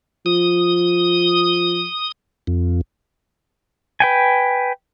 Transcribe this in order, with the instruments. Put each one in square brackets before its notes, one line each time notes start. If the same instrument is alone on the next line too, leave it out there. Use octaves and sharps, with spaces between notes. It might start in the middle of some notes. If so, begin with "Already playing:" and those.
[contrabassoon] F3 [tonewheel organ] D#6
[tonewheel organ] F2
[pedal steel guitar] B4 G5 G#5